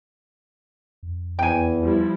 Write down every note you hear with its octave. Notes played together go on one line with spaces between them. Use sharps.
F2
E2 G5 G#5
F3 G3 E4